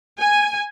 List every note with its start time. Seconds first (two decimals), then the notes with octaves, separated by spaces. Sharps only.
0.18 G#5